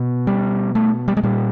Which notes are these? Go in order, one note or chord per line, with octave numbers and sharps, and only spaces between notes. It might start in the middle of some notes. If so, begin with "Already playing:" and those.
Already playing: B2
G3
A3
G3
G#3
A#2 G3